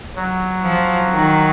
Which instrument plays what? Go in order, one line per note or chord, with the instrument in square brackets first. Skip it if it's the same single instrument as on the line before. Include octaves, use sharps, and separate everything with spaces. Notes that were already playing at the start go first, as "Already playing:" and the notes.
[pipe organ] F#3
[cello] F3
D#3